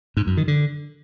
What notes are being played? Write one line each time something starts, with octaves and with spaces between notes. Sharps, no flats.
G#2
F#2
D#3
D3